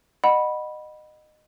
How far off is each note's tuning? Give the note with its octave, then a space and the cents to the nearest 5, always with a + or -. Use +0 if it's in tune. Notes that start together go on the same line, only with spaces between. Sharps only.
D#5 -25 F#5 +0 B5 -10